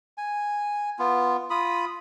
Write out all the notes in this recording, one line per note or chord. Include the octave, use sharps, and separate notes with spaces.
G#5
B3 F4
F4 B5 D#6